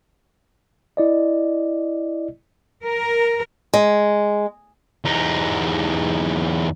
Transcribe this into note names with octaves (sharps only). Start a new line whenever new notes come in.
E4 D5 D#5
A#4
G#3
E2 D#4